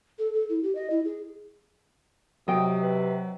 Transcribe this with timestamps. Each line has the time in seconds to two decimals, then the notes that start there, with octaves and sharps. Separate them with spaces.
0.19 A4
0.33 A4
0.49 E4
0.63 G4
0.75 D#5
0.90 E4
1.05 G#4
2.48 C3 F#3 D#5 G5 D#6
2.82 B4